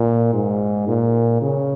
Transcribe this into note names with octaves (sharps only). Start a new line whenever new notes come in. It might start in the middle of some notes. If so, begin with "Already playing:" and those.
Already playing: A#2
G#2
A#2
C#3